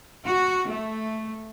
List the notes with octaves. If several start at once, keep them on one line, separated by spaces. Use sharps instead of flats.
F#4
A3